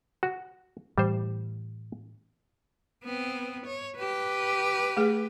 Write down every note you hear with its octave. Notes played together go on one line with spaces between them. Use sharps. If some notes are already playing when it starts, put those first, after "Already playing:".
F#4
A2 E3 G3 C5
B3 C4
C#5
G4 B4
A3 G#4